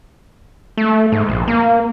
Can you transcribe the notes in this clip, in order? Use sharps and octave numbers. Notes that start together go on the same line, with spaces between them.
A3
G#2
A#1
A#3